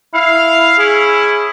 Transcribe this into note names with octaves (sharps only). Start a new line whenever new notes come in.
E4 F5
C#4 E4 G#4